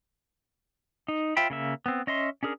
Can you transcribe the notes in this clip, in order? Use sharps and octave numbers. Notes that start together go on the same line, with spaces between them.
D#4
F4 C5 E5 G5 B5
C#3 A#3 E5
B3 C4
C#4 D#5 E5 C6
C#4 D4 G#4 A#4